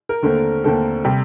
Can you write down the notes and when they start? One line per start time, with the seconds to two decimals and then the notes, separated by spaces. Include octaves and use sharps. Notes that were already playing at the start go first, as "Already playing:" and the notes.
0.09 A#4
0.22 D#2 D3 A3 C4
0.64 D#2 D3 A3 C4 A4
1.05 C3 G3